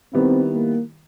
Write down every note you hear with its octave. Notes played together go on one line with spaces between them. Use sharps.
D#3 G3 B3 C4 E4
A#3